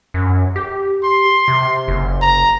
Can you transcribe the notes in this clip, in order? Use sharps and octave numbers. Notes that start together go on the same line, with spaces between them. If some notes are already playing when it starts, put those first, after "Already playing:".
F#2
G4
C6
C3
F#1
A#5